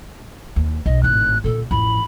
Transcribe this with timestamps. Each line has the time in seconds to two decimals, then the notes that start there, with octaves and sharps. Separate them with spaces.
0.56 D#2
0.86 B1 D#5
1.03 G#1 A2 F#6
1.44 A#2 D3 A4
1.71 A1 F2 B5